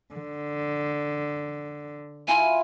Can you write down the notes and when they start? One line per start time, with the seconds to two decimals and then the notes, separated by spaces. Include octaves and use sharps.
0.14 D3
2.28 E4 F4 G#5